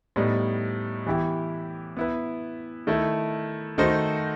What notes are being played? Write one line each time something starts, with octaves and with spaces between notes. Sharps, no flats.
A2 G3 B3 D#4
E3 B3 E4 G4
B3 E4 B4
D#3 A3 E4
D#3 A3 D#4 F#4 C5